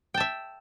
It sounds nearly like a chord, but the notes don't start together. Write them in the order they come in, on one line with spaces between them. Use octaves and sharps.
G5 A5 E5